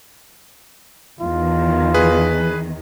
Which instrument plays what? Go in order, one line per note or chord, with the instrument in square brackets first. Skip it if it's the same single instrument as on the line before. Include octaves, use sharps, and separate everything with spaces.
[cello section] E2 D#3 [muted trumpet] F4
[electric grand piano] G#4 B4